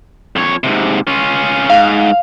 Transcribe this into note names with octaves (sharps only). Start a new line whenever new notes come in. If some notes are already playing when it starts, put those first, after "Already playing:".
F2 C#5
G#2 C3
C#4 F4
G#2 F5